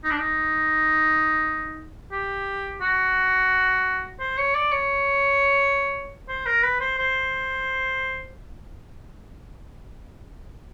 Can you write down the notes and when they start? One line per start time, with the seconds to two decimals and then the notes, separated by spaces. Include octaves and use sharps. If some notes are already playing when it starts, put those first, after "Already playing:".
0.04 D#4
0.11 D4
0.19 D#4
2.12 G4
2.81 F#4
4.20 C5
4.38 C#5
4.55 D5
4.72 C#5
6.29 C5
6.46 A#4
6.63 B4
6.81 C5
6.98 C5